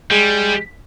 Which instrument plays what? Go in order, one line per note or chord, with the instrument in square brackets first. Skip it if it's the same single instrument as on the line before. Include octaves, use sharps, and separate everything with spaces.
[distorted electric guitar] G3 [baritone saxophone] G#3